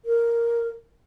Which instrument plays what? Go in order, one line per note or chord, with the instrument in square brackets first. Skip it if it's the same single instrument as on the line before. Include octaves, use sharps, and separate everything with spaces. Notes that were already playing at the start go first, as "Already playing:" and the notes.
[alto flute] A#4